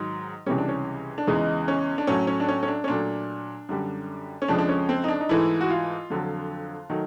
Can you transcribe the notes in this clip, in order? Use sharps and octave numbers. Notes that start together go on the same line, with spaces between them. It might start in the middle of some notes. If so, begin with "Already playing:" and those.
Already playing: G#2 D#3 F#3
C#2 C3 E3 G3 C#4
D4
C#4
D4
E2 C#3 E3 G#3 D#4
C#4
D4
A2 F#3 A3 C#4
C#4
D4
C#4
C#4
D4
C#4
A#2 F#3 A3 D4
F#2 D3 G3
C#4
F2 C#3 F3 G#3 D4
D4
C#4
C4
D#4
D4
D#4
G#2 E3 A3 E4
F#4
F4
F2 D3 F#3
D#3 F#3 A3